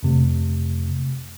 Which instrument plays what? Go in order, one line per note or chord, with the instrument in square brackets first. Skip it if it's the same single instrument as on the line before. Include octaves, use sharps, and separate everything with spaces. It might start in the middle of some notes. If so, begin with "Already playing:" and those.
[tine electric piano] F2 C3 A3